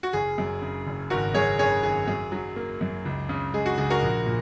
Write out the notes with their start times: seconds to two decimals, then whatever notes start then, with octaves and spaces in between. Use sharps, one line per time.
0.03 F#4
0.13 F#1 G#4
0.38 F#2
0.62 C#3
0.87 F#1
1.10 G#1 F#4 A#4
1.34 F#2 G#4 C#5
1.59 C#3 G#4 C#5
1.83 G#1 G#4
2.07 F#2 G#4
2.32 F#3
2.56 A#3
2.81 F#2
3.05 C#2
3.29 C#3
3.54 G#3 G#4
3.66 F#4
3.78 C#2 G#4
3.90 F#4 A#4
4.02 A#1
4.26 A#2